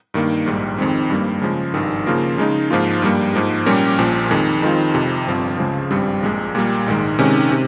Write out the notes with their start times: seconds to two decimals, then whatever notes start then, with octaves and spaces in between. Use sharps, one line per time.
0.14 G2 D#3 A#3
0.46 A#1 G#2 G3
0.78 F2 D#3 G#3 C4
1.10 G2 G3 A#3
1.42 C#3 F3 G#3
1.74 G#1 G2 D#3
2.06 C#3 F3 A#3 F4 A#4
2.38 C#3 G#3 D#4
2.70 G#2 F3 A#3 F4
3.02 G2 G3 A#3
3.34 G#2 F3 A#3
3.66 A#2 G3 C#4 G4 A#4
3.98 A#1 A#2 F3
4.30 F2 D#3 G#3
4.62 F2 D#3 G#3 C4 F4
4.94 F2 C3 F3
5.27 G1 G2 F3 C4
5.59 C#2 C#3 F3 G#3
5.90 G#1 G2 G3 C4
6.23 A#1 A#2 G#3
6.55 A#2 G3 A#3
6.86 A#1 G#2 D#3 G#3
7.19 C3 D#3 G#3 C#4
7.51 C3